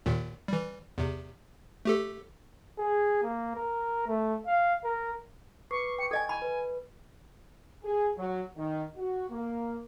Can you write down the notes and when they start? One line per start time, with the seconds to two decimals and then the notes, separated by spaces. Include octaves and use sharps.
0.06 D#2 A#2 D#3
0.48 E3 G3
0.98 E2 C3
1.85 A3 G4 A4
2.78 G#4
3.23 A#3
3.55 A#4
4.07 A3
4.47 F5
4.84 A#4
5.71 B4 C#6 D6 C7
5.99 G5 C#6 C#7
6.11 A4 D#5 G#5 G#6
6.29 G#5 B5
6.42 B4
7.84 G#4
8.17 F#3
8.57 D#3
8.97 F#4
9.30 A#3